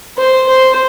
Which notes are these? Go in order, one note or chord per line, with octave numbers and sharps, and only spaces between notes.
C5
C5